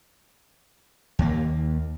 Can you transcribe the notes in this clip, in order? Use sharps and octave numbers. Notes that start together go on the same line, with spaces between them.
D#2 A#3